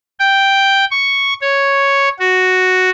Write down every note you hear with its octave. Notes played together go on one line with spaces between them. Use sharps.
G5
C#6
C#5
F#4